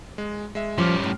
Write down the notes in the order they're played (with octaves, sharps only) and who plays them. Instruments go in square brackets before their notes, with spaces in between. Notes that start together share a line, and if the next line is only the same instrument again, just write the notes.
[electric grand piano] G#3
G#3 E5
[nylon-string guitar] F3 [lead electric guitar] G3 C#4 [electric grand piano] C6 D6 F6
[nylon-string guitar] A2